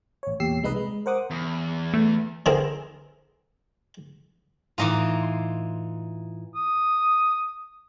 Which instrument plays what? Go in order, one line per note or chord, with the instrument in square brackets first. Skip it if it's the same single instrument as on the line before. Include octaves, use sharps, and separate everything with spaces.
[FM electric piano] A1 C#5
E2 A#2 G4 E6 C7
C2 C3 G#3 D#4 B4 D#5
G#3
A#4 C5 F#5 D6 D#6
[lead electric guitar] E2
[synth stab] A3
[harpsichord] D3 C4 E4 G#4 A#4
[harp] A2 A#5 D6 [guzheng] E3 D#4 F4
[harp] C6
[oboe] D#6